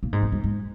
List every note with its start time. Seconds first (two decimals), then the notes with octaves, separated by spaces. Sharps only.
0.03 A#2
0.13 G#2
0.22 F#2
0.32 G#2
0.44 G#2